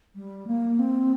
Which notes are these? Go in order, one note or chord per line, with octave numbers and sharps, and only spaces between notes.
G3
A#3
C4